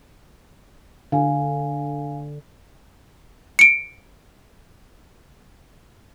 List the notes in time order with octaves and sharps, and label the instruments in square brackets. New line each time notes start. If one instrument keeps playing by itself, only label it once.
[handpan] D3 [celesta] F5 G#5
[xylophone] C#7 D7